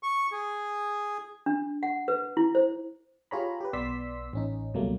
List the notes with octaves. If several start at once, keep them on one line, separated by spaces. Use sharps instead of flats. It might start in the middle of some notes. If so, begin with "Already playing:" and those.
C#6
G#4
D4
F#5
B4
E4
C5
F4 G4 G#4 C#5 A#5 B5
G4 B4
B1 B3 D5 C6 E6 B6
A1 C#4 D#4
C#2 B2 F#3 G3 A3 A#3